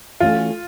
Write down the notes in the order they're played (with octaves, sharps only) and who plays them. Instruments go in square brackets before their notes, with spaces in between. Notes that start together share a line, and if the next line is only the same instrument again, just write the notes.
[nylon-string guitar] E3 A3 C#4 F#4 A4 [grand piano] F4